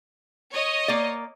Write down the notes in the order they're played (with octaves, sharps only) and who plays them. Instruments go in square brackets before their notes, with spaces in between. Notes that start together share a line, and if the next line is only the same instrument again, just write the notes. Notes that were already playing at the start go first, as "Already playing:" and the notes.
[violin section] C#5 D#5
[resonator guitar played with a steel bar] A#3 D5